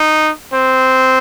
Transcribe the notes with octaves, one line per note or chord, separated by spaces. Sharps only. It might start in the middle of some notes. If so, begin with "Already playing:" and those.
Already playing: D#4
C4